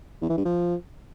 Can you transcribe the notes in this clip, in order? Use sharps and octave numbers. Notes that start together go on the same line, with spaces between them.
E2
E3
G2
F3